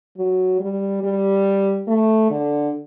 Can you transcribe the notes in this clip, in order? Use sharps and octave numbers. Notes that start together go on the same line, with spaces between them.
F#3
G3
G3
A3
D3